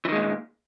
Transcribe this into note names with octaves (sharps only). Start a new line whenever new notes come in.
A#2 D#3 E3 G#3